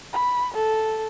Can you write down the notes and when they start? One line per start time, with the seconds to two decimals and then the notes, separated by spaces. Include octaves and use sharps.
0.13 B5
0.54 A4